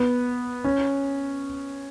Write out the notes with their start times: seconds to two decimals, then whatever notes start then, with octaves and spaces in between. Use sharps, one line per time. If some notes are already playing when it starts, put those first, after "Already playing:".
Already playing: B3
0.64 C#4